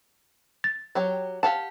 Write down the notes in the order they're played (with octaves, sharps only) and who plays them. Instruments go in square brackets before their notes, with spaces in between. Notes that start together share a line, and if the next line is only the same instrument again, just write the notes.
[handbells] A6
[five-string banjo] F#3 G4 C#5
[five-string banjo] G4 F5 F#5 [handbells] A5